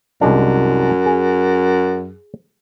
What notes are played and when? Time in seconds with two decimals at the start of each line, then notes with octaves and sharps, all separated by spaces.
0.21 C2 F#2 G#3 D4
1.06 G#4